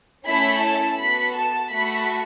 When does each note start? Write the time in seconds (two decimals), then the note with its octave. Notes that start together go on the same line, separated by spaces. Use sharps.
0.25 A3 C#4 E4 A4 B5
0.62 A5
0.98 B3 F#4 A4 B5
1.34 A5
1.70 A3 F#4 A4 B5